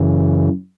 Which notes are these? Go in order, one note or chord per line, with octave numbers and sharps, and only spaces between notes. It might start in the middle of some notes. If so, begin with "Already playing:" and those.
Already playing: F#2 C#3 E3